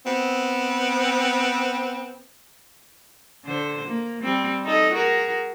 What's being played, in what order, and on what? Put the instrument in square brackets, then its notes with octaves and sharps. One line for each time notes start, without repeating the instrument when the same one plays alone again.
[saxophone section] B3 C4
[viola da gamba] D3 C5
A#3
G3 C4
D#4 A4 D#5
F#4 G#4 A#4